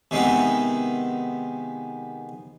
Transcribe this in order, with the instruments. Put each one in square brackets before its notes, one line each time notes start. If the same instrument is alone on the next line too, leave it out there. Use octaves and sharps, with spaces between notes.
[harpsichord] C3 D#3 G#3 B3